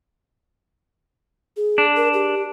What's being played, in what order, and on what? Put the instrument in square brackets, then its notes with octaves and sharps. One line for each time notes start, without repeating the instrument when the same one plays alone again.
[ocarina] G#4
[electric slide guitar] D4
[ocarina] A#4
G4